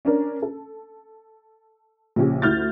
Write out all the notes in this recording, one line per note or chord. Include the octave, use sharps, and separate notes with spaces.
C#4 D4 A#4
A4
A#1 C#3 C#4 G4
D2 E4 F6 G6 A6